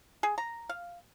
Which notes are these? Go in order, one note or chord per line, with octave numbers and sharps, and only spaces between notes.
G#4
A#5
F5